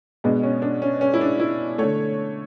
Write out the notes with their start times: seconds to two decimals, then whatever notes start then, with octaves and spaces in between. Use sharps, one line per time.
0.24 B2 G#3 B3 D4
0.43 C#4
0.62 D4
0.82 C#4
1.01 C#4
1.14 E4
1.21 D4
1.40 E4
1.78 D3 A3 C#5